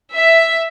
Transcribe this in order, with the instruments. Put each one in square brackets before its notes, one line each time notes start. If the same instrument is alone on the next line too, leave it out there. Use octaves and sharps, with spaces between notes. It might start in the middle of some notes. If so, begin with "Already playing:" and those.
[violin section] E5